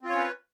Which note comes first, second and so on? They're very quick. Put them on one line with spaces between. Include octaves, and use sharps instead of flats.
C4 F4 C#5 C#4 B4